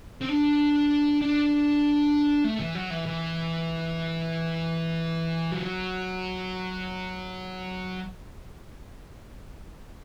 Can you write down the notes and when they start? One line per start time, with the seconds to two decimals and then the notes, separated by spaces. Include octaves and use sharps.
0.22 C4
0.29 D4
1.21 D4
2.44 A3
2.60 E3
2.75 F#3
2.90 E3
3.06 E3
5.52 F#3